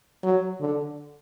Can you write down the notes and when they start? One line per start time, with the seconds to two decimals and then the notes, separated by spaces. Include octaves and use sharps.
0.24 F#3
0.60 D3